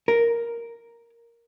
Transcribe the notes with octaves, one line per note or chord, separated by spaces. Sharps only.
A#4